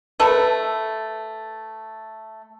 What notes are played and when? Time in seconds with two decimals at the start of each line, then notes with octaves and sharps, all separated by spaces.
0.20 A3 A4 B4